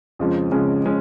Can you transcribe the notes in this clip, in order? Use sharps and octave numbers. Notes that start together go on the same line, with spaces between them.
F2 C#3 F3 G#3 C#4
F2 C#3 F3 G#3 C#4
C#3 G#3 C#4